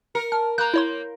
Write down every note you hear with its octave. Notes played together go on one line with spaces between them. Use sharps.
A#4 C#7
A5 F6
A#3 A#5 F#6 G6
E4 C#5 C6